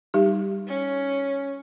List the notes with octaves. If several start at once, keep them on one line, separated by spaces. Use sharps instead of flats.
G3 D#4 G4
C#4